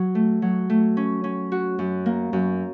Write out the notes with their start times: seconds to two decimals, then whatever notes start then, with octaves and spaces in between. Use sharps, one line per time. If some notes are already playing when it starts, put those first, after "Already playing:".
Already playing: F#3 F#4
0.15 A3
0.42 F#3
0.70 A3
0.97 C#4
1.24 C#4
1.52 F#4
1.79 F#2
2.06 A#3
2.33 F#2